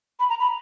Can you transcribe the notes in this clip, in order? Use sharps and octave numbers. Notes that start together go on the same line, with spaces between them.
B5
A#5
B5